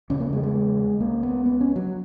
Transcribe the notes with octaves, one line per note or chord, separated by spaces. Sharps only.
E2 C#3 C#4
A#3
G#3
G#3
C#2 C#3 A#3
B3
B3
C#4
F#3